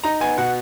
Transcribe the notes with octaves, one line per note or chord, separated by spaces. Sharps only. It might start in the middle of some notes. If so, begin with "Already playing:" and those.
D#4 A#5
B3 G#5
B2 F#5